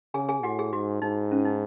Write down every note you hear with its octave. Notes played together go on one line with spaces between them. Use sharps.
C#3 G#4 G#5
G#4 G#5
A2 F#4 F#5
G#4
G#2 F#4
G#2 D#4
C#4
D#4